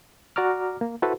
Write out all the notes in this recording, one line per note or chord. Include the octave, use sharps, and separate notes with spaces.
F#4 D5 A#5 D6 F6
A#3
E4 F#4 A4 B4 C5